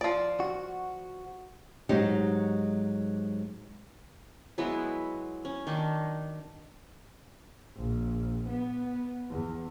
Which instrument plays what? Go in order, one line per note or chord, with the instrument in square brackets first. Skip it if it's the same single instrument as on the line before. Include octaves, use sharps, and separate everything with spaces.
[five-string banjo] F3 D5
[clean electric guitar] F#4
[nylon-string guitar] G#2 F#3 G#3 D#4 G4
[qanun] F#3 G#3 B3 E4
C#4
D#3 D4 D#4
[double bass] A#1
B3
E2